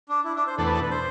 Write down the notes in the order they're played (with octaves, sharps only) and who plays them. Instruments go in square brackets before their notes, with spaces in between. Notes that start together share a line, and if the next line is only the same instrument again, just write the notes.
[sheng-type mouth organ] D4
E4
D4
C5
[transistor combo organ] E2 B2 A3 D4 [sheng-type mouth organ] A4
[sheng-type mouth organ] B4
A4
B4
C5